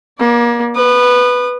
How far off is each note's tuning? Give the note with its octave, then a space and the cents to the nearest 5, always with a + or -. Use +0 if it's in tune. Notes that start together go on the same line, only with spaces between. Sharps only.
A#3 +35 D5 +0
B4 +0 D#6 -30